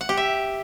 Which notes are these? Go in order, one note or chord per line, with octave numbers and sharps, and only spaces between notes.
F#5
G4
E5